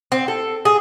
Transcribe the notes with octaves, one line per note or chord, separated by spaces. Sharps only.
C4
A4
G#4